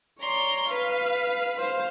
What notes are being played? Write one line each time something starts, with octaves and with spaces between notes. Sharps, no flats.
C#5 D5 A#5 C6
B4 F5
C5 F5